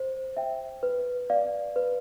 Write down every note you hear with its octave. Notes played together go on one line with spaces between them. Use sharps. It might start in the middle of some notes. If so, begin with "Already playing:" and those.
Already playing: C5
E5 G5
B4
D5 F5
B4